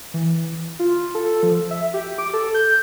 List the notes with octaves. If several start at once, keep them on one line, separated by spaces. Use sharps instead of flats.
E3
F4
A4
F3
E5
G4
D6
A4
G6